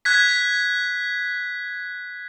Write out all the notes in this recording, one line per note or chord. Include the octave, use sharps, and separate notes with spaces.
F#6 G#6 B6